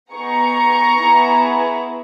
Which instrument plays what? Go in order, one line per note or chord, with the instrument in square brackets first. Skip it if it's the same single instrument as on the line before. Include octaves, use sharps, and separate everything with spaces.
[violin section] B3 D#4 G#4 A#5 C#6
B3 E4 G#4